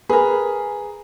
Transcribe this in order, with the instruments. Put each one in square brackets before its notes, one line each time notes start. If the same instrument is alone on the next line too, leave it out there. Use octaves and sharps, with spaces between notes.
[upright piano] G#4 [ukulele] A#4 B4